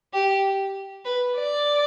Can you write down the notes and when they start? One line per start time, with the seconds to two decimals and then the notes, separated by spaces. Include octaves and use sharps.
0.13 G4
1.05 B4
1.36 D5